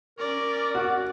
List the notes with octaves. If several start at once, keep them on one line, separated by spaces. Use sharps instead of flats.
C#4 A#4 D5
F#4